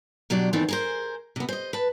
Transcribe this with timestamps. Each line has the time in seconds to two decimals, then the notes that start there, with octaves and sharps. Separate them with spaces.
0.30 B2 F#3 D4 G4 D5
0.53 D#3 E3 A3 B3 C4 D4
0.69 G#4 A#4 C5
1.36 C3 B3
1.49 C5 D#5
1.73 B4 A5